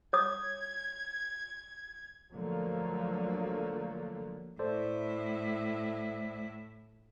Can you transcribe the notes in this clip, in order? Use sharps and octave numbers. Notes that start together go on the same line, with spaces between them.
C#5 D#6 G#6
D3 F3 F#3 A3 A#3
A2 E4 A4 C5 D5